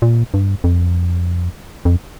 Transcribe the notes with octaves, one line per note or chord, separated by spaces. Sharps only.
A#2
G2
F2
F2